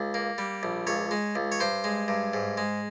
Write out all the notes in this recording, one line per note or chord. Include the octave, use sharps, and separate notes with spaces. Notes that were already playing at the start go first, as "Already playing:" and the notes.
Already playing: C#2
A#3
G3
A#1
C#2 C#5
G#3
C#2
C#5
G2 C5
G#3
G2
G#2
G#3